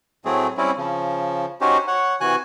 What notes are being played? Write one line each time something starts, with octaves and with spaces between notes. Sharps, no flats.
A2 F#3 A3 C4 G#4
G3 C4 C#4 E4
C#3 F3
C#4 D#4 F#4 G4 C5
C#5 F#5
C3 E3 F#4 G#5 F#6